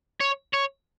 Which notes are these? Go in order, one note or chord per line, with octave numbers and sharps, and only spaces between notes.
C#5
C#5